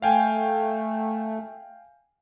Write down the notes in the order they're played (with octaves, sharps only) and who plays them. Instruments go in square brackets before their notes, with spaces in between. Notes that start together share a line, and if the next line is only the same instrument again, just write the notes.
[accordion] A3 [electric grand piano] F5 G5 G#5